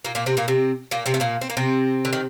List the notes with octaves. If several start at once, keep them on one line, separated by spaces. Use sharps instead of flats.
A#2 A#3
A#2 A#3
C3 C4
A#2 A#3
C3 C4
A#2 A#3
C3 C4
A3
A#2 A#3
C4
A#3
C3 C4
D3
D#3